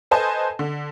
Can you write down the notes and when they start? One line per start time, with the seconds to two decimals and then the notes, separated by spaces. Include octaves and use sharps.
0.11 A4 B4 C5 D#5 G#5 A5
0.59 D3